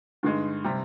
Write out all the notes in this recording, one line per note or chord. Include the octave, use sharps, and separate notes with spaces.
G2 D3 G#3 D#4
C3 G3 C4